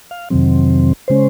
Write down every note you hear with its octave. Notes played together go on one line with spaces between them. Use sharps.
F5
F2 C3 D#3 F#3 C4
C#3 G#3 C#4 C5